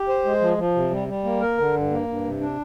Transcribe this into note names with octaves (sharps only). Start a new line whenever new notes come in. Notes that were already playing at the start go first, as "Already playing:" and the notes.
Already playing: G4
C5
G#3
F3
F3
C3
G3
G3
A#3
A#4
D3
G2
A#3
G2
C3
D4